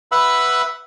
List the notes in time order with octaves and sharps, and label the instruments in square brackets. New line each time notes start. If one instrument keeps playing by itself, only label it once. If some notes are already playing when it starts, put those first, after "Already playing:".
[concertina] B4 E5 F#5 B5 E6